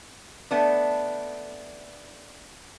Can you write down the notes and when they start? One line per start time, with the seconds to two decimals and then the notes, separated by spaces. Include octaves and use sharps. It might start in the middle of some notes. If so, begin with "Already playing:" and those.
0.51 A3 B3 D4